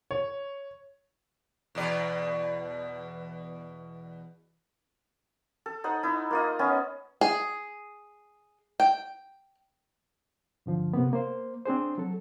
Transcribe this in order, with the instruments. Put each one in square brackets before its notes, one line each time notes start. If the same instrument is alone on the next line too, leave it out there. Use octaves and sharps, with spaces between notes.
[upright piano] C#5
[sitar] E2 B2 D5
[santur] A4
D#4 C5 F#5
D#4 E4
A#3 F4 D#5
B3 C#4 D#5
[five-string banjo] G#4
G5
[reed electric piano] G2 D3 F3
C3 A#3 B3
A#3 C5
C4 D4 G#4 C5
F#3 A4